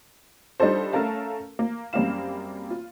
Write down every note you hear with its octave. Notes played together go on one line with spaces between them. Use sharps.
G3 D4 D#4 F4 A4 C5
A3 C#4 A4 A#4 F5 A5
A#3
F#2 G3 A#3 C4 F5 E7
F4